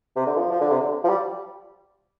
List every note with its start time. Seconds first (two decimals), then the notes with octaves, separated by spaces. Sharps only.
0.16 C3
0.26 D3
0.36 F3
0.51 F3
0.61 D3
0.71 C3
0.80 D3
1.04 F3
1.09 G3